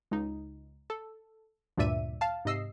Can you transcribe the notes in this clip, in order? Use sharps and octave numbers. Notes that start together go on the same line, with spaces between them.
C#2 D#4
A4
D2 G2 A#2 D5 E5 D#7
F5 A5
G#2 C3 D#5 E6 C7